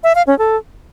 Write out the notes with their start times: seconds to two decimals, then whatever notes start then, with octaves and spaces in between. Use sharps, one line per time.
0.04 E5
0.15 F5
0.27 C#4
0.39 A4